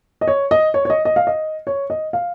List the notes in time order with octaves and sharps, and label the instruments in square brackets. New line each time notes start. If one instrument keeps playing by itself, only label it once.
[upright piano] D#5
C#5
D#5
C#5
C#5
D#5
D#5
F5
D#5
C#5
D#5
F5